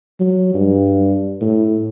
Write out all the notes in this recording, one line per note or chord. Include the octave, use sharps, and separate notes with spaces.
F#3
G2
A2